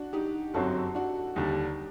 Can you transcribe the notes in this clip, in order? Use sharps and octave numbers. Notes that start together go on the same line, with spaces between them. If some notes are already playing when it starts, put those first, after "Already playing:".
Already playing: D4 F#4
D#4 G4
G1 F#2 F#3 C4 F#4 A4
D4 F#4
D#2 D3 G3 D#4 G4